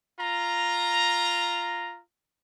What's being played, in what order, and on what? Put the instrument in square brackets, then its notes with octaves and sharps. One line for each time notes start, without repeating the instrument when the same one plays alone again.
[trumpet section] F4 A#5